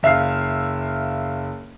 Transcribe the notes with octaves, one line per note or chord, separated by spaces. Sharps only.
F#1 E5 F5 F6 C7